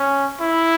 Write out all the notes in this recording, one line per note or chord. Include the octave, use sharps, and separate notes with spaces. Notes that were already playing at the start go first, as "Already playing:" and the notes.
Already playing: C#4
E4